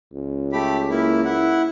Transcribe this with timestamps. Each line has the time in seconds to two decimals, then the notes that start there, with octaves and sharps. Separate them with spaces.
0.13 C#2
0.53 A3 G4 B5
0.91 A#3 E4
1.25 E4 F#5